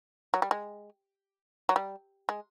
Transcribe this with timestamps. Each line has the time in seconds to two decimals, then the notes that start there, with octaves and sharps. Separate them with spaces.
0.34 F#3
0.42 G3
0.51 G#3
1.69 F#3
1.76 G3
2.29 G#3